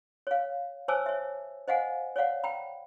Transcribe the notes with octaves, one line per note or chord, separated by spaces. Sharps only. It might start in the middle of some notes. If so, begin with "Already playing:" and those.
C#5 F5
C5 C#5 G#5 A5 D6 E6
C#5 E5
C5 D#5 F5 F#5 G#5
C#5 D5 F5 F#5
G5 A#5 B5